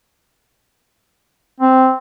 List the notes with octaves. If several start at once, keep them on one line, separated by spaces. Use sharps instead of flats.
C4